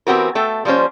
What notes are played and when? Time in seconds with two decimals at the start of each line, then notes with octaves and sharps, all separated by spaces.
0.07 E3 B3 C4 F#4 G4 A#4
0.35 A3 A4 G5
0.65 F3 G3 A#3 C#4 C5